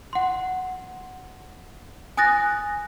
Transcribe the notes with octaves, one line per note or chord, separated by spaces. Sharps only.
F#5 C6
G#5 D#6 F#6 A6 A#6